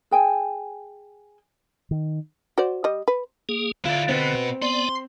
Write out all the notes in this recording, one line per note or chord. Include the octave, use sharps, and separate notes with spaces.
G#4 G5 G#5
D#3
F#4 C5 D5
G3 D#5
B4
A#3 G#4
D3 E4 F4 D5
B2 B3 C4
B3 D5 C6